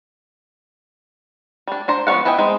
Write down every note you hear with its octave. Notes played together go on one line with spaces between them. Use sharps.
G3 D4
D4 C5 A#5
F3 B3 C#5 F5 F#5
B3 E4 D#5 G5 G#5
G#3 B3 C4 D#4